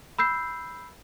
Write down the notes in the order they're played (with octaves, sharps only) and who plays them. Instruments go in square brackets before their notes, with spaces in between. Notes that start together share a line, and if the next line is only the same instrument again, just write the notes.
[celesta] B5 E6 G6 C7